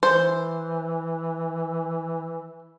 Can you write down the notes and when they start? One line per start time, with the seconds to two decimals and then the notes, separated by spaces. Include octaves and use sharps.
0.03 E3 C5